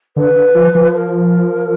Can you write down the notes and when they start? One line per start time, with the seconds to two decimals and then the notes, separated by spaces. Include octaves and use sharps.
0.16 D3 B4
0.36 D3
0.55 F3
0.75 F3
0.94 A#4